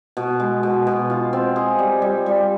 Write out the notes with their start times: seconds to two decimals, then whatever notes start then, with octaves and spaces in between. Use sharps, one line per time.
0.17 B2
0.40 G#3
0.63 B2
0.87 B2
1.10 F4
1.33 C4
1.56 G#4
1.79 G3
2.02 G3
2.26 G3